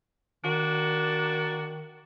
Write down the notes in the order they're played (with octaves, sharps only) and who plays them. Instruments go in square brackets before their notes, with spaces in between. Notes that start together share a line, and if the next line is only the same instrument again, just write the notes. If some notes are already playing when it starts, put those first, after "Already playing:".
[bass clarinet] D#3 [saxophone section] A#3 D4 F#4